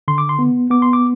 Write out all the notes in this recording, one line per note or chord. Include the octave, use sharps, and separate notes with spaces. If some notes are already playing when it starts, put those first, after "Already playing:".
D3 C6
D6
C6
B3
B3 D6
C6
D6